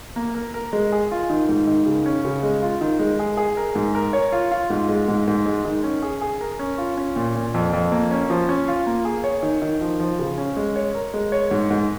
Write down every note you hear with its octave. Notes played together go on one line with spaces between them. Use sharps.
A#3
A#4
A#4
G#3
G#4
F4
D#3
G#2
D#3
C#3
C#4
C#3
G#3
F4
D#3
G#3
G#4
G#4
A#4
G#2
A#4
C#5
F4
F4
G#2
G#3
G#2
G#2
G#3
D#3
C#4
G#4
G#4
A#4
C#4
F4
C#4
A#2
A#2
F2
F2
A#3
C#4
F3
C#4
F4
A#3
G#4
C#5
D#3
D#3
F3
F3
C#3
C#4
G#3
C#5
A#4
G#3
C#5
G#2
G#2